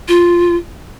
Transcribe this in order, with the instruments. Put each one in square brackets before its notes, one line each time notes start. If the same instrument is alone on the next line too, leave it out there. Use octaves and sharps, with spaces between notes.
[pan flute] F4